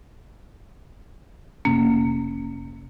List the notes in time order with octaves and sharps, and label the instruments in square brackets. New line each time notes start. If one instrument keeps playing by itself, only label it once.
[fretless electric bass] F1 C3 C#4 [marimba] A#3